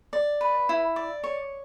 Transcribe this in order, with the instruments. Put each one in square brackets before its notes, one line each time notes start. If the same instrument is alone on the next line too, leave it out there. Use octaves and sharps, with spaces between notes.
[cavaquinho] D5
B4
E4
D5
C#5